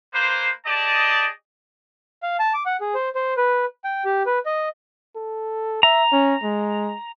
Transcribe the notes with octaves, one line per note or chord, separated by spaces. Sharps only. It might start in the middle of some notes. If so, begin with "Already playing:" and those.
A#3 B4 C5
G4 G#4 D5 D#5 A5
F5
A5
D6
F#5
G#4
C5
C5
B4
G5
G4
B4
D#5
A4
E5 A#5
C#4
G#3